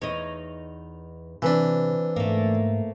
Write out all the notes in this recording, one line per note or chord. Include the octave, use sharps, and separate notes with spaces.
E2 D#4 C#5
C3 E3 C4 D4 B4
G#2 A3 A#3